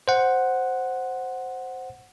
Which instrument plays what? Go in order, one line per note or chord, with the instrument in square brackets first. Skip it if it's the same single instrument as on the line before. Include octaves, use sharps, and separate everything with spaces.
[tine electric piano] C5 F#5